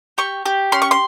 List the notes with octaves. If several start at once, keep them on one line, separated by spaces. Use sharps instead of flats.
G4 C#6
G4
C#4 C6
C#6
C6